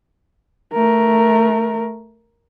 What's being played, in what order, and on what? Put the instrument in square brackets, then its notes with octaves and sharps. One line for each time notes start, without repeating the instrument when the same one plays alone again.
[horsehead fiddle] A3 A#4